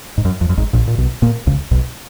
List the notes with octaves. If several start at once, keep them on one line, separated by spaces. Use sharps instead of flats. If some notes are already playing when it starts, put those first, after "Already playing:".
G#2
F#2
F2
F#2
G#1 G#2
A#1 A#2
A#2
B1 B2
A#2 A#3
C#2 C#3
B1 B2